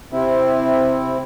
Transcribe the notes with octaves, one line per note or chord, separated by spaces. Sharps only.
C3 C4 E4